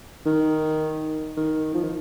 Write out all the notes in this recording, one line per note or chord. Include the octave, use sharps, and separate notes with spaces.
D#3
D#3
F3
D#3